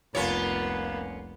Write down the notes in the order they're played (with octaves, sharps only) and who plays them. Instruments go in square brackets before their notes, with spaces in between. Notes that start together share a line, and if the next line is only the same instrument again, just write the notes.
[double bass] F1 C2 [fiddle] A#3 B3 [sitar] C#4 F4 C#5